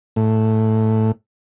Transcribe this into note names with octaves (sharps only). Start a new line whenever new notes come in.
A2